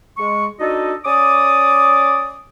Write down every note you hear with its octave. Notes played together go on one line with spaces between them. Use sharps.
G#3 C#6
D4 D#4 F#4 A4 D#5
C#4 D5 D6 D#6